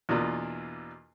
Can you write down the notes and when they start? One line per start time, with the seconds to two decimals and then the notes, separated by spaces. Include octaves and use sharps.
0.09 E2 B2 E3 A#3 D4 F4